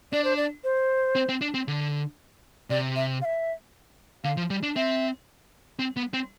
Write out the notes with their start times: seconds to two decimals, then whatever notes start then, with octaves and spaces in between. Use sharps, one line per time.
0.12 D4 D5
0.24 C5
0.37 D5
0.64 C5
1.15 C4
1.29 C4
1.41 D4
1.54 C4
1.68 D3
2.70 C3 D5
2.96 E5
3.22 F5
3.25 E5
4.24 D3 F5
4.37 F3
4.50 G3
4.63 D4
4.76 C4 E5
5.79 C4
5.97 B3
6.13 C4